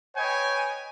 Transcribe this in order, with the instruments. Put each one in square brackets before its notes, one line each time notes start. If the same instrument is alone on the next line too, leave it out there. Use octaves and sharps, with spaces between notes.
[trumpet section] B4 C#5 D#5 G5 G#5